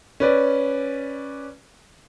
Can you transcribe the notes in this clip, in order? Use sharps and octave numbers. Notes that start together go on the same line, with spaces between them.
C#4 B4 D5